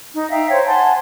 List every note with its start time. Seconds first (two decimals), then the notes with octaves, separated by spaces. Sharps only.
0.14 D#4
0.31 E5 F5 G5 A#5
0.51 C5 C#5
0.66 F#5 G#5 A5 C6